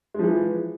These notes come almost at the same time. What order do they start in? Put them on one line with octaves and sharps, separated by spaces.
G#3 F3 E3